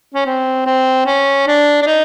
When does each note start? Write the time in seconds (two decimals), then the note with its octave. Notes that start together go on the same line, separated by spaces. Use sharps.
0.14 C#4
0.26 C4
0.66 C4
1.06 C#4
1.47 D4
1.82 D4
1.87 D#4